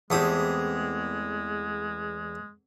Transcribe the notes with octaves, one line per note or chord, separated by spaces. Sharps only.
E2 G#3 A3 C4 G4 D#6